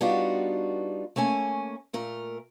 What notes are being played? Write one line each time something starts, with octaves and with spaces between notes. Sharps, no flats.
G3 B3 D4 D#4 F4 F#4
A3 A#3 C#4 G#5
A#2 A3 A#4